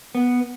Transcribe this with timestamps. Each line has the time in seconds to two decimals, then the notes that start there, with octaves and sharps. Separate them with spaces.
0.15 B3